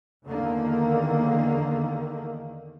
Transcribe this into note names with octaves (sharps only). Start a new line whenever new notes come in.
E2 D3 D#3 A#3